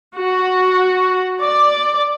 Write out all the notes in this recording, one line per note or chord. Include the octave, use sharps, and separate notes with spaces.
F#4
D5